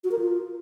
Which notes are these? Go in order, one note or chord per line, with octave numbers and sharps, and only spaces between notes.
F#4
A#4
F4